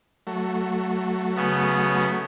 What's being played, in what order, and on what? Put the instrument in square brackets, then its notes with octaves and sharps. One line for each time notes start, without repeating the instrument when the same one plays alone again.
[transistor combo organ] F#3 A3
[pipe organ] C#3 B3